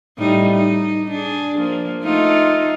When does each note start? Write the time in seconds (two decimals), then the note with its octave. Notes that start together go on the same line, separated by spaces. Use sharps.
0.18 A2 G3 D#4
0.51 D#4
1.11 D4 G#4
1.59 F3 A#3
2.03 A3 D#4 F4